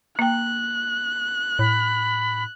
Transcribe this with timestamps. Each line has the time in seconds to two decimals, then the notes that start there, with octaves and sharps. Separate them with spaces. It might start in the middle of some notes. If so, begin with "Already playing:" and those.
0.19 A#3 G5 F#6
1.59 A2 B5